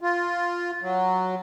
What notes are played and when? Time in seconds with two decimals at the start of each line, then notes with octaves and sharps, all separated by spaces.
0.01 F4
0.82 F#3